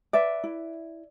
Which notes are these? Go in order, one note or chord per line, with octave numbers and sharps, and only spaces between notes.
B4 D5 E5
E4